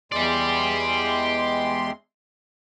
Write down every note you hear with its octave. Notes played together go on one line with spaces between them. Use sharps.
E2 G#3 G4 D5 C6